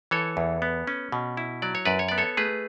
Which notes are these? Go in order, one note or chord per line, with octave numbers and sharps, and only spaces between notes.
E3 A4 C#5
E2
B3
C#4
B2
E4
F#3 D5
C#5
F#2 B4 D5
C#5
B3 D5
A4 C#5
A3 G#4 B4